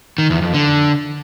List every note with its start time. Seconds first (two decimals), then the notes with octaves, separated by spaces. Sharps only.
0.18 D#3
0.30 E2
0.42 F2
0.54 D3